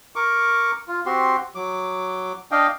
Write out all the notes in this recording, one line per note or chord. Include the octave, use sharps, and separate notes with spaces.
A#4 C#6 D6
F4
C4 F#4 G4 C6
F#3 D6
D4 D#5 F5 G5